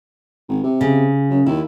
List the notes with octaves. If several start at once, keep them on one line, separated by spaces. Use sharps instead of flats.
G#1
C3
C#3
F#2
D#2 E4